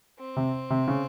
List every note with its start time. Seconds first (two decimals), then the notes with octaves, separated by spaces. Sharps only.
0.19 C4
0.37 C3
0.70 C3
0.88 C#3